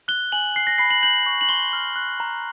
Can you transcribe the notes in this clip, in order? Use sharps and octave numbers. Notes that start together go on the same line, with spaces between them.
F#6 G7
G#5 F#7
F#6 C7
A#6
B5 C7
F#7
G6 F#7
C#6
F#7
C6 G7
F6
F#6
A#5